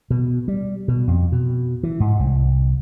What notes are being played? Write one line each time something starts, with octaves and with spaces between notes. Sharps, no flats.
B2
G3
B2
F2
B2
E3
G#2
C2